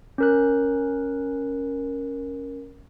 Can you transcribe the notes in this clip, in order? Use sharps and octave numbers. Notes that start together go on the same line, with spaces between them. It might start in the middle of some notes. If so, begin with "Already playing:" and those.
C#4 A#4 F#6